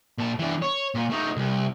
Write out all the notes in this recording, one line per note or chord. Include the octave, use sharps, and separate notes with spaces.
A#2 A5
E3 D4
C#5
A#2
A3 D#4
C2